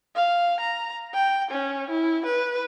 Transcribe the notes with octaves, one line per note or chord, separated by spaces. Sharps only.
F5
A#5
G5
C#4
E4
B4